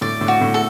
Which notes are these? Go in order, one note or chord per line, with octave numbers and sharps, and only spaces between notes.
A2 D5
A2
F#4
A2
A4